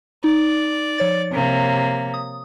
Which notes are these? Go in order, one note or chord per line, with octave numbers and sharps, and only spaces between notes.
D#4 D5
F3 C#5 A6
C3 A#3
D#6